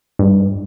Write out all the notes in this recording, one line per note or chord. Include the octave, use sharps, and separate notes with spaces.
G2